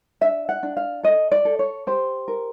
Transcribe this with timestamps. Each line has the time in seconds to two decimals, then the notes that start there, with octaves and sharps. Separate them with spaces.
0.21 D4 E5
0.49 F#5
0.63 D4
0.77 F5
1.03 A4 D#5
1.31 D5
1.45 A4
1.59 C#5
1.87 G4 C5
2.28 A#4